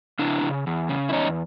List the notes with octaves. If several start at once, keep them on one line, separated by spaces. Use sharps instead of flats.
C#3 D4 E4
C#3
E2
C#3
E4
E2 C#4 D#4